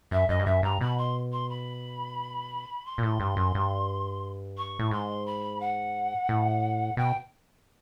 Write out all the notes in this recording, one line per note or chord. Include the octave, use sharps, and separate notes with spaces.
F#2 E5
F#2 D#5
G2
F#2 E5
G2 A#5
B2 B5
C6
C6
B5
C6
A#2
A2
G2
F#2
G2
C#6
A2
G#2 C6
B5
F#5
A2
B2 G5